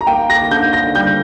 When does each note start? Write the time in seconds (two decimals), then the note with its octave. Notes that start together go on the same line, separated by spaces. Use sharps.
0.01 A#5
0.07 A#3 G5
0.30 A#6
0.51 D3 G6
0.73 A#6
0.95 G3 G6